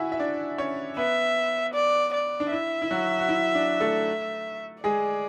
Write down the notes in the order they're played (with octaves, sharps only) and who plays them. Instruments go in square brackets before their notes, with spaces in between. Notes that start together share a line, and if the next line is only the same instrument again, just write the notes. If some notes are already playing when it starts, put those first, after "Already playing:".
Already playing: [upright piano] E4 F#4 E5 F#5 G#5
E5
D4 D5
C#4 C#5
[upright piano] B3 B4 [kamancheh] E5
[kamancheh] D5
D5
[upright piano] D4
[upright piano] E4 [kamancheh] E5
[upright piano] E4
F#3 F#4
F#4
E4
D4
A3 A4
[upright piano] G#3 G#4 [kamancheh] D5